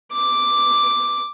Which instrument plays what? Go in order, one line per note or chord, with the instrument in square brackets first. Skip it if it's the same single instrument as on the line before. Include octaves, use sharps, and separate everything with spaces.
[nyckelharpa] D6